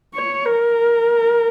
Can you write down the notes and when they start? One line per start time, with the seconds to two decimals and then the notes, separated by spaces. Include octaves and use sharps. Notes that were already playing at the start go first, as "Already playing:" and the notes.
0.14 C#5
0.46 A#4